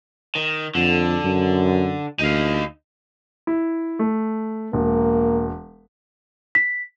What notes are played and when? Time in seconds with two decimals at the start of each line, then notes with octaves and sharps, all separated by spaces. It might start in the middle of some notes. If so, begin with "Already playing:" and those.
0.35 D#3
0.75 F2 D3
1.25 F#2
2.19 D2 D#4 F5
3.47 E4
3.99 A3
4.73 E1 A#3
6.55 B6